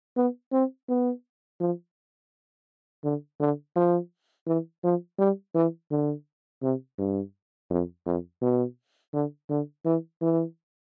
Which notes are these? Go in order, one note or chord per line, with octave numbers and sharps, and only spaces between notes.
B3
C4
B3
F3
D3
D3
F3
E3
F3
G3
E3
D3
C3
G2
F2
F2
B2
D3
D3
E3
E3